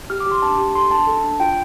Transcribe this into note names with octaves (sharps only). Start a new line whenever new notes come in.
G4 F6
D6
G4
C6
D4 A5
G4
A4 C6
D4 A5
A4
D4
F4 G5